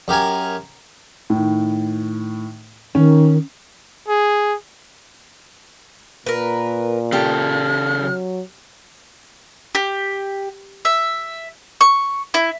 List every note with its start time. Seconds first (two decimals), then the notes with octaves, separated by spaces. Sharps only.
0.08 F#2 G4 A#4 G#5
1.30 A2 D#3
2.95 D#3 C#4
4.08 G#4
6.26 A#2 A#4 B4
7.12 C#3 G4 A4 F6
8.01 F#3
9.75 G4
10.85 E5
11.81 C#6
12.34 E4